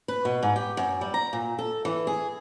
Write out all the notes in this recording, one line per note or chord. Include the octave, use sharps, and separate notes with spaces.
B4
B2
G#2
G4
F#2
G3
A#5
A#2
A4
E3
G#4